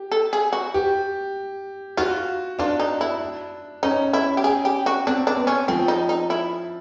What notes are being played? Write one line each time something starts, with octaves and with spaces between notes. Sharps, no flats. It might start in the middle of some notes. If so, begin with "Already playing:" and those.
Already playing: G4
A4
G#4
F#4
G4
F4 F#4
D4 F4
D#4
E4
C#4 D#4
E4
G4
G#4
G4
F#4
C4 D4
D4
B3
C#4
F3 C4
D#4
D#4
E4